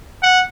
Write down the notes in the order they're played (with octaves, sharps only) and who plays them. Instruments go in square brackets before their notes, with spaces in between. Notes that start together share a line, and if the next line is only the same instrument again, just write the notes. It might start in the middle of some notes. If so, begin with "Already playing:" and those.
[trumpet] F#5